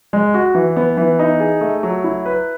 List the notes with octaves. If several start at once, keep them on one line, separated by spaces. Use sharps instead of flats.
G#3
F#4
E3
B3
E3
D#4
G#4
A3
F#3
E4
B4